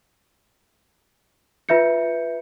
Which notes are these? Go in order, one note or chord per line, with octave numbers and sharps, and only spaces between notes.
F4 B4 E5 G6 C#7